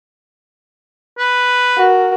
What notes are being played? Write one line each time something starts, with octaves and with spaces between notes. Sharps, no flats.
B4
F#4 A#4